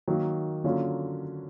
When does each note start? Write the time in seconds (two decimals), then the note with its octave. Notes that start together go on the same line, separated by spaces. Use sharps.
0.08 D#3 F#3 A#3
0.64 D3 F#3 A#3 C#4 F4